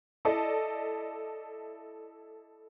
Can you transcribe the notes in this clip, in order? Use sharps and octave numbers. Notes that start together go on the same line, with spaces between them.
E4 A4 D5 D#5